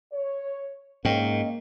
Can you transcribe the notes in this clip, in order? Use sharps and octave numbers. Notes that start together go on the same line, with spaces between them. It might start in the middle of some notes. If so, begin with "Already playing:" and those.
C#5
G#2 A#3 C#4 D#5 G5